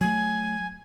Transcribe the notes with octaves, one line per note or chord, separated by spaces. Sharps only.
F#3 A3 G#5